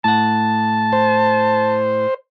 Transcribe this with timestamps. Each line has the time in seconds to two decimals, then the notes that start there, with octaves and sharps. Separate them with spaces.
0.05 A2 F#5 A5
0.93 C5